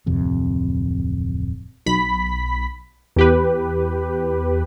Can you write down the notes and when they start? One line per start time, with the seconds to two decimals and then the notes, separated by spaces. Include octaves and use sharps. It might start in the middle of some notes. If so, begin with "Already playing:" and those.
0.06 D1 F2 C3
1.86 B1 B5 B6
3.16 E2 G4 B4